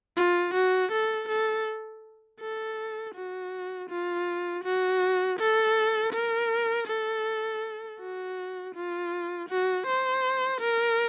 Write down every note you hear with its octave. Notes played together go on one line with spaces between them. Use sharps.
F4
F#4
A4
A4
A4
F#4
F4
F#4
A4
A#4
A4
F#4
F4
F#4
C5
A#4